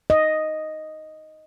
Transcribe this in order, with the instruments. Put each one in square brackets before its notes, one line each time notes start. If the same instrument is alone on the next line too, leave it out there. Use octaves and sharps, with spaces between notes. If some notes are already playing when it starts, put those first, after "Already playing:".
[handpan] D#5